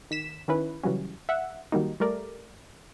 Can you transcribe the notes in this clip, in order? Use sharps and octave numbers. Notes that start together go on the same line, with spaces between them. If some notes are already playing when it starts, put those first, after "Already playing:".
D#3 B6 E7
D#3 C#4 E4 B4
C#3 E3 F#3 G3 C#4
E5 F#5
D#3 F#3 G3 A#3 D#4
G3 A3 A#4 D5